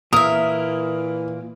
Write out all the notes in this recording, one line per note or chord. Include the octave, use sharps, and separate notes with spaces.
A#2 E3 A#3 A#4 E5 D#6